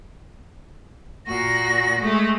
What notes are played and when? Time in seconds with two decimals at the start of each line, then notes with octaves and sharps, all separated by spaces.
1.27 A#2 F#4 A#6
2.00 G#3 A3